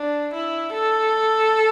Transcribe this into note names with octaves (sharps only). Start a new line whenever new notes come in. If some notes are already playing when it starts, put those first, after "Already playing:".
Already playing: D4
E4
A4